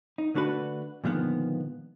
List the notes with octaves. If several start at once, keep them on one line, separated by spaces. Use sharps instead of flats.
D#4
D3 A3 D4 F#4 B4
A#2 D3 D#3 F3 G#3 B3